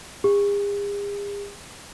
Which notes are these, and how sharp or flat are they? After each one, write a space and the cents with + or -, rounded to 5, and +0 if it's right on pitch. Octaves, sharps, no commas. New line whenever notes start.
G#4 -45